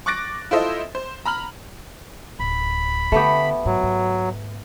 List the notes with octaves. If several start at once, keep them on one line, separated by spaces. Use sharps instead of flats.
C#6 D6 F#6 A6 A#6 D7
E4 F4 A4 C5 D#5 E5
C5
A#5 B5 F6 F#7
D1 B5
D3 A3 B3 G4
G#2 F#3
G#2